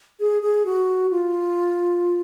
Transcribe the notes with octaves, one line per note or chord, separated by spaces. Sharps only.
G#4
G#4
F#4
F4